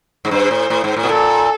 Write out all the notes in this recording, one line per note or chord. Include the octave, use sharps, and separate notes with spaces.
G#2
G2 C5
A2
A2
G#2
A2
B2
A#2 A4